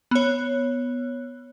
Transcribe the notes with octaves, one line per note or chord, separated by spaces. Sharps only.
B3 C#5